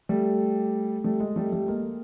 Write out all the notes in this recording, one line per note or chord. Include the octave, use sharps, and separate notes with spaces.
G3 A3
G3 A3
G#3
G3 A3
G3 A3
G#3 A#3